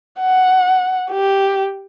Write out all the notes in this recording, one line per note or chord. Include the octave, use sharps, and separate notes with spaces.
F#5
G4